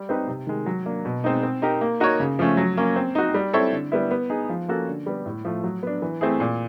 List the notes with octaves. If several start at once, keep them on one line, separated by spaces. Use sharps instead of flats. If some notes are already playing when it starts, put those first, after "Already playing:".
Already playing: G3
C4 D#4 G4 B4
C3
D#3 G#3
F#3
A#3 D4
B2
G#3 C4 D#4
C4
D#4 G4 A#4
A#3
D#4 F#4 A#4 C#5
C#3
F3 A3 C#4
F#3
A#3 C#4
C4
D#4 F#4
G3
C4 E4 A4 C#5
D3
G3 B3 E4
B3
D#4 G#4
F3
A#3 C#4 F#4 A4
D3
G3 B3
A2
F3 A3
F#3
B3 D4
E3
A3 C4 E4 G#4
A#2